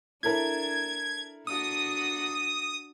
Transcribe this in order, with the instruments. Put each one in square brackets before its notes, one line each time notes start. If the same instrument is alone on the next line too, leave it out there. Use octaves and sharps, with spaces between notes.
[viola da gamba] D4 [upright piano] E4 A4 A#4 [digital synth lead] G#6
[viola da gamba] D4 F#4 [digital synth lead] D#6